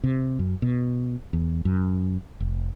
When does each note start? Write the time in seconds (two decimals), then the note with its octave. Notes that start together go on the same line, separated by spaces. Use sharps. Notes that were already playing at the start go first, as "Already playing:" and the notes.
0.04 C3
0.39 F#2
0.62 B2
1.33 E2
1.65 F#2
2.40 F1